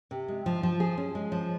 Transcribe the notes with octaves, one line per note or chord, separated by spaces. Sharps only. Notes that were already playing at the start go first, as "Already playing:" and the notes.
C3
G#3
F3
F3
G#4
C#4
G#3
F3